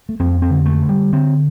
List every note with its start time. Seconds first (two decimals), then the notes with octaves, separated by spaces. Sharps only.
0.09 A3
0.20 F2 C4
0.42 C4
0.50 D3
0.66 A3
0.82 D3
0.89 G3
1.12 D3 C4